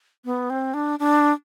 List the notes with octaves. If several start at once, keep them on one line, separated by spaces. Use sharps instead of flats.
B3
C4
D4
D4